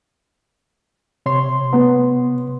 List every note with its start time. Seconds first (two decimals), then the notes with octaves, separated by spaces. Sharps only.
1.26 C3 C#5 C6
1.73 B3